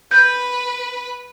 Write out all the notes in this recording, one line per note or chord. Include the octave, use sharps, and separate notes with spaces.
B4 G6